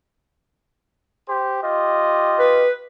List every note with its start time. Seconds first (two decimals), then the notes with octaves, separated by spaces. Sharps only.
1.28 G4 C5
1.62 F4 G4 D#5
2.39 B4